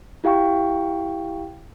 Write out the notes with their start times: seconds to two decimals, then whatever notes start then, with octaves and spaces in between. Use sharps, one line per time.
0.24 E4 G4 F5 G5 C#6